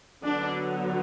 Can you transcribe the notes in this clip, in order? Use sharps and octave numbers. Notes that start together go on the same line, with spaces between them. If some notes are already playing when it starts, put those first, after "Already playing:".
D3 F#3 B3 D4